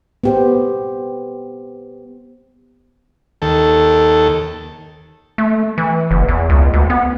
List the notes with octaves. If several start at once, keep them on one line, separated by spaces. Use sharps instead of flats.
B3 G4 C5
D#2 A4
A3
E3
F#1
E2
C#2
D2
B3